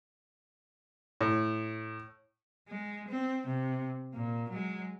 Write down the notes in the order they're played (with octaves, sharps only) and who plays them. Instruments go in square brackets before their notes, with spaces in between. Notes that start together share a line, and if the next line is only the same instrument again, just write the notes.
[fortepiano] A2
[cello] G#3
C4
C3
A#2
F#3 G#3